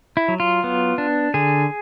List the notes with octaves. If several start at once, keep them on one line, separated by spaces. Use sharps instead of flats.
E4
F#3
F4
B3
D4
D3 G#4